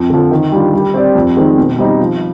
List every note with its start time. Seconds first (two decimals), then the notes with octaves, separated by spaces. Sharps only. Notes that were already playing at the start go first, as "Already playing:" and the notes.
Already playing: F2
0.10 D3 F3
0.31 D#3
0.52 G3 D4 F4
0.73 G3
0.94 C4 G4 D5
1.15 F2
1.37 D#3 G#3 C4 D#4
1.58 B2
1.79 G3 C4 D#4
2.00 F3